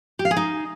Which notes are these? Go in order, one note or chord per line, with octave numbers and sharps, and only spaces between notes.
G4
F5
G#4
D#4